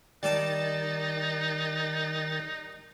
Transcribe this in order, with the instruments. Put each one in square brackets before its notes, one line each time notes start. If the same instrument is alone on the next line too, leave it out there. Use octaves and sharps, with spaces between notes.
[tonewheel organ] D#3 A6 [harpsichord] G3 D5 A5 [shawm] D#4